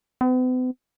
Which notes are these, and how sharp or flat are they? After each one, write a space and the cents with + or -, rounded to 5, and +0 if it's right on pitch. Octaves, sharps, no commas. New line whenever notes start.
B3 +45